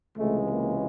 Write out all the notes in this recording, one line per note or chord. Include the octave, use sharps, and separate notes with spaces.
C#2 C3 E3 G#3 A3
A#3